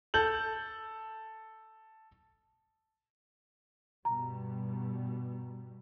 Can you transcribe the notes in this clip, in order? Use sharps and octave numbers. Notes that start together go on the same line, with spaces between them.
A4 G6 F#7
G2 B2 G3 A#5